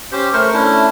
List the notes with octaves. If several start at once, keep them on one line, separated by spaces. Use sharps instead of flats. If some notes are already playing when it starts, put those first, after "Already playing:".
C#4 G4 C5
A3 A#4 C5 C#6
A3 C#4 D4 E4